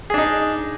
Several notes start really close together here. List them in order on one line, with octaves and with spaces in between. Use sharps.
G#4 D4 D#4